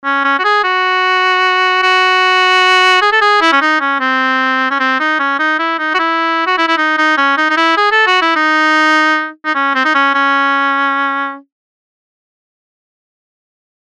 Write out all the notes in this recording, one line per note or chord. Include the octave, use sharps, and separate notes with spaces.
C#4
C#4
F#4
G#4
F#4
F#4
G#4
A4
G#4
E4
C#4
D#4
C#4
C4
C#4
C4
D#4
C#4
D#4
E4
D#4
F#4
E4
F#4
E4
E4
D#4
D#4
C#4
D#4
D#4
E4
G#4
A4
F#4
E4
D#4
D#4
C#4
C4
D#4
C#4
C#4